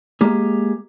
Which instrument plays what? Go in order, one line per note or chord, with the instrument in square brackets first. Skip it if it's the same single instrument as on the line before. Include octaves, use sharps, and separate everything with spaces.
[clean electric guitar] G#3 A#3 G4 G#4